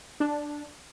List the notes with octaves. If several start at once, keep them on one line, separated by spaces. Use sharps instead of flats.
D4